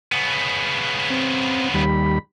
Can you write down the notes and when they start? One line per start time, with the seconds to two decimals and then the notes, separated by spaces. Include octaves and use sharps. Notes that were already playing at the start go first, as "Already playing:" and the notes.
0.12 C#3 B3
1.10 C4
1.74 D#2 G3 B5